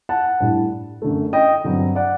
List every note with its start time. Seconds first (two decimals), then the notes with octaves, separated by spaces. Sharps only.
0.09 F#5 A5
0.40 A2 G3 D4
1.02 F#2 D3 A3
1.33 D#5 G5
1.64 G2 D3 F#3 C4
1.96 D5 F#5